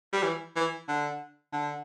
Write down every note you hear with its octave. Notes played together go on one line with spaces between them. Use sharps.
G3
E3
E3
D3
D3